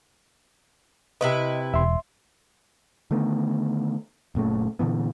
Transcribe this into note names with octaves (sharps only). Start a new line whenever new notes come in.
C3 E4 B4 D#5
E1 E5 C6
D3 D#3 A3 B3
F#1 A#2 C#3 A3
A#2 D3 E3 B3